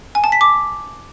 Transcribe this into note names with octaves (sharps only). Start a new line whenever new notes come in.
G#5
A5
B6
D6